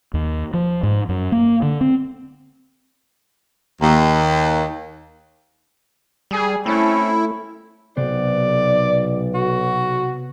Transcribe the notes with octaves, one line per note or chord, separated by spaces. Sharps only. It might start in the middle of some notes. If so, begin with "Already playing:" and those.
D#2
F3
G#2
F#2
A#3
D3
C4
D#2
G3 G#4
A3 C4 C#4 E4 A4
B1 C3 B3 C5 D5
F#4